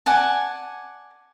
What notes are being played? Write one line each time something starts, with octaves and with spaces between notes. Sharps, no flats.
D5 F#5 G#5 A5